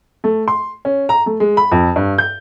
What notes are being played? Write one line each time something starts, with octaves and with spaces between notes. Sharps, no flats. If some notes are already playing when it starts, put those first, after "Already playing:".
A3
C6
C#4
A#5
A3
G#3
B5
F2
G2
G6